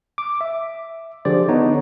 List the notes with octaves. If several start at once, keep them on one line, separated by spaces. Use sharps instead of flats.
D6
E5
D3 F3 G4 G#4 C5 D5
D3 B3 D4 D#4 C#5